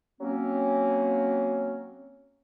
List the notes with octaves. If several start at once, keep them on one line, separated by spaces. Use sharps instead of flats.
F#3 A#3 C4 C#4